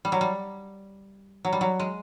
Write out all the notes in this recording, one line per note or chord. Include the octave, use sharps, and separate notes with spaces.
G3
F#3
G3
F#3
G3
F#3
G#3